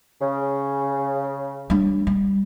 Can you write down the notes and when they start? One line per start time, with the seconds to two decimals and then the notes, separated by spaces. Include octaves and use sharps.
0.21 C#3
1.70 G3 D4
2.07 G3